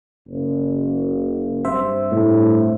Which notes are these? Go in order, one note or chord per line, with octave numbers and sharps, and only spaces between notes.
F#1
G2 C4 C5 E5
A2